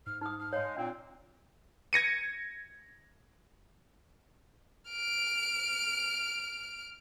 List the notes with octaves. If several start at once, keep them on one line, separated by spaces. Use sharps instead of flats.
G#2 F6
D#4 D#6 F6
F6
G#3 C#5 F5
A#2 C4 D4
G#6 A#6 C#7 D#7
F6 D7